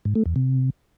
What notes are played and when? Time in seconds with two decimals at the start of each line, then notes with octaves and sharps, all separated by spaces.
0.05 G#2
0.15 A3
0.26 E2
0.36 C3